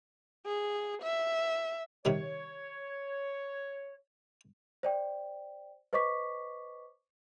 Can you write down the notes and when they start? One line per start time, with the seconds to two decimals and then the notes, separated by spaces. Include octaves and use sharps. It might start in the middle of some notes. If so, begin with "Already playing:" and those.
0.46 G#4
1.02 E5
2.05 C3 D#3 G3 C#5
4.83 C5 D5 G5
5.93 B4 C5 D#5 C#6 D6 B6